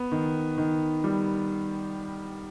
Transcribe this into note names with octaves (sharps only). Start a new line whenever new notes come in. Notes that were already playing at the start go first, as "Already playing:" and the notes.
Already playing: B3
D#3
D#3
G3